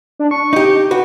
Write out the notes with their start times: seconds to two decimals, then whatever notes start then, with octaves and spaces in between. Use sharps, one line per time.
0.19 D4
0.31 C#6
0.53 D#4 G4
0.91 F#4 B4